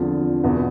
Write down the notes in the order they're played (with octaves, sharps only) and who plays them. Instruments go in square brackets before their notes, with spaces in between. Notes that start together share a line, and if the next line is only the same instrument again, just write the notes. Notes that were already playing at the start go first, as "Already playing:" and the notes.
Already playing: [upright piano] E2 D3 F3 C4 F4
E2 B2 B3